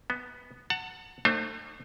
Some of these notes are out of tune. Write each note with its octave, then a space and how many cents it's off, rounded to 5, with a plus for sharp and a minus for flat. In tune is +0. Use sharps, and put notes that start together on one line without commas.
B3 +0 D#5 +40
F#5 +0 A5 +35
A3 +35 D#4 -45 C5 +30